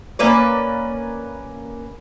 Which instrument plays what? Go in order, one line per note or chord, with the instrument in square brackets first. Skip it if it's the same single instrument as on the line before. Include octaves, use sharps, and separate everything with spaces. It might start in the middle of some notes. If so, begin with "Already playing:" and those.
[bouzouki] A#3 C#4 B4 D5